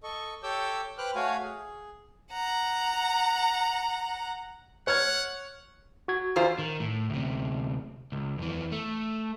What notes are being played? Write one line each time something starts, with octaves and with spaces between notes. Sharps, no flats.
A4 D#5 C#6
G4 A4 C#5 D6 E6 G6
B4 C5 G5 D6 F6 F#6
A3 F#4 C#5 F5 G#5
G#4
F#5 A#5
C#5 F#5 F6 G#6
F#4 G#6
E2 F4 C5
D#3
A2
D2 C3
C#2
F2 E3
A3